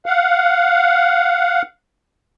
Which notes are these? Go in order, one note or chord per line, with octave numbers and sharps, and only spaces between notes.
F5 F#5